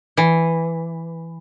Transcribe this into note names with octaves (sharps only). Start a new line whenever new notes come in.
E3